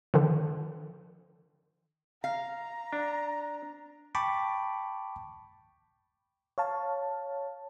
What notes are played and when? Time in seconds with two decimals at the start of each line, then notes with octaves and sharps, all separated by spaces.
0.14 D3 D#3 F3
2.24 F5 A#5
2.93 D4
4.15 G5 A5 B5 C#6 D6
6.58 C#5 F5 A5